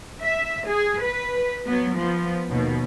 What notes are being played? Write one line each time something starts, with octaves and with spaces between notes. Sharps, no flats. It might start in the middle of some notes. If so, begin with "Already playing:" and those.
E5
G#4
B4
F#3 B3
F3 B3
D#2 B2